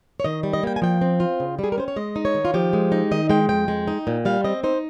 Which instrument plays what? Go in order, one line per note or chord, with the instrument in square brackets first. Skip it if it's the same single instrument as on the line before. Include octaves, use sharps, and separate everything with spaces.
[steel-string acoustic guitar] C#5
D#3 D#5
G3
D#5
A#3 G5
G#5
F3 G5
C4
F4
C#3
G3 G#4
A#4
C#4 C5
C#5
G#3 D#5
D#4
C#5
D#3
F4
F3 G4
G#3
D#4
D#3 D#5
G#3 G5
F2 G5
G#3
D#4
A#2
G3 F5
C4 D#5
D#4 C5